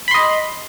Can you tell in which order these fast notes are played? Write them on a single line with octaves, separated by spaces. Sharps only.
B5 C6 D#5